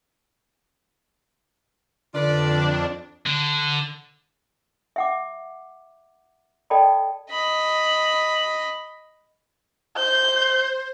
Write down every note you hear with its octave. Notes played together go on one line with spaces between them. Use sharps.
F2 D3 D4 F4 B4 D5
D3
E5 F#5 D6
A4 D5 D#5 G5 A5 B5
D#5 B5
C5 G6